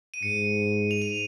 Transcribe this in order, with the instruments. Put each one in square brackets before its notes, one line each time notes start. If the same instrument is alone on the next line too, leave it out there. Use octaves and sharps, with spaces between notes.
[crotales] D#7
[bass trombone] G#2 [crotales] C#7
[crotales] F7
D#7